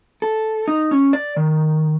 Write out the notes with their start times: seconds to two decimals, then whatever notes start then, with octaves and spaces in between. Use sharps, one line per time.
0.22 A4
0.68 D#4
0.91 C#4
1.13 D5
1.37 D#3